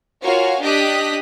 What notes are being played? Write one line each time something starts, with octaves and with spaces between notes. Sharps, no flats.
F4 F#4 A#4 C#5 F5 G#5
D4 G4 D#5 D#6 F#6 B6